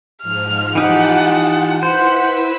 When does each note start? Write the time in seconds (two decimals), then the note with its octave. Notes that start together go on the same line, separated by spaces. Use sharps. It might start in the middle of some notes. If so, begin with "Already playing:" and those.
0.23 G#2 F3 F6
0.75 E3 D#4 F4 G4 F#5 G5 A5
1.83 E4 B4 C5 F#5 B6